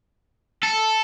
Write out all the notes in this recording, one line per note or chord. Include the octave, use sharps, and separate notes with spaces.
A4